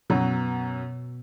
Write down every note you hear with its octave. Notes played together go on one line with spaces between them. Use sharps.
F#2 B2 F#3